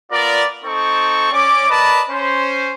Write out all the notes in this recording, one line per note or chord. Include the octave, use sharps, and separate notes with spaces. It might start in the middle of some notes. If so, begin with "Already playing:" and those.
B3 F4 A#4 D5
C4 D#4 A4 C#6
C#4 D5 D6
A#4 B4 D5 D#5 A5 B5
C#4 C5